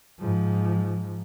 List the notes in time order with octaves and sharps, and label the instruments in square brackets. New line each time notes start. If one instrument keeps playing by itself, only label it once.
[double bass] G#2 F3